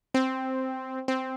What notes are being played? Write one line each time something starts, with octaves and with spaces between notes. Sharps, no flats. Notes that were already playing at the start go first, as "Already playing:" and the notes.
C4
C4